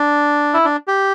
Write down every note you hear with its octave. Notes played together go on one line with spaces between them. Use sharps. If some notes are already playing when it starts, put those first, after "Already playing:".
Already playing: D4
E4
D4
G4